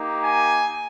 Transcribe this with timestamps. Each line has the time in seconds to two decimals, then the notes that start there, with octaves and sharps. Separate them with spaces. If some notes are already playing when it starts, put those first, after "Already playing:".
Already playing: A#3 D#4 G4
0.23 G#5